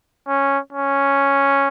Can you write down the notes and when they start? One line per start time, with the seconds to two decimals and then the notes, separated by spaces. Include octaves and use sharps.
0.28 C#4
0.73 C#4